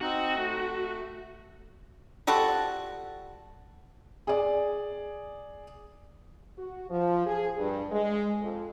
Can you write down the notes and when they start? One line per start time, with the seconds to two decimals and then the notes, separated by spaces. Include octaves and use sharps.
0.01 C4 D#4 F#4
0.35 A3
2.27 F3 G3 F#4 A4
4.27 G#4 D5
6.57 F#4
6.90 F3
7.25 G#4
7.58 G2
7.91 G#3
8.40 F2